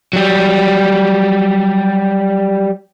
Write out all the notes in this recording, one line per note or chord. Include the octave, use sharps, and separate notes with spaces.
F#3 G3